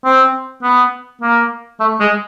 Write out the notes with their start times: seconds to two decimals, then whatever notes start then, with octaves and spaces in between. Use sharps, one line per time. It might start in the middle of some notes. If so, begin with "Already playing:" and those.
0.05 C4
0.63 B3
1.22 A#3
1.80 A3
2.00 G#3